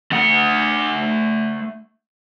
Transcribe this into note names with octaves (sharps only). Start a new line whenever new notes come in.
A3 F#5